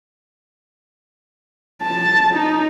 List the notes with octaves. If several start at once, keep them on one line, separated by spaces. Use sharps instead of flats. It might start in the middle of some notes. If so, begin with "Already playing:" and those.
A5
D#4